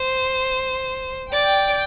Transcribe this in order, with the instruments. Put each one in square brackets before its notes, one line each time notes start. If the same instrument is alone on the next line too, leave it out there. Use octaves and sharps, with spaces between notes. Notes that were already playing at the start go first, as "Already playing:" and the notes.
Already playing: [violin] C5
[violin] D5 [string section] G5